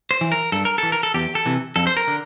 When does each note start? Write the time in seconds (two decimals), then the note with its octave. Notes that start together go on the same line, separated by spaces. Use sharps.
0.11 C5
0.21 E3
0.32 A#4
0.52 G2 A4
0.65 A#4
0.78 E3 A4
0.92 A#4
1.03 A4
1.14 E2 G4
1.35 A4
1.46 C3 E3
1.76 F2 A4
1.87 C5
1.97 A#4
2.08 D3